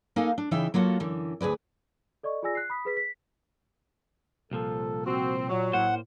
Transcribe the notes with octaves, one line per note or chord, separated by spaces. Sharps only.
A#3 D#4 A4 F5 G#5
D4
C#3 E3 D#4 E5 G5
F#3 A#3 F4 F#4 A4
F#2 D3 E3
D2 G#4 B4 D5
A4 D5 D#5 C#6
F4 G#4 D5 G#5 E6 A#6
F#6 C7
B5 D#6 B6
G#4 B4 B6
B6
C2 A#2 F3 A4
C4 F#4
A#2 F#3
A2 A#3 C5 F#5